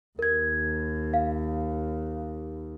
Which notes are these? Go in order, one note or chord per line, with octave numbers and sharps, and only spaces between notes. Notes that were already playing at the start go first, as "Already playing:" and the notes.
D#2 A#4 G#6
F5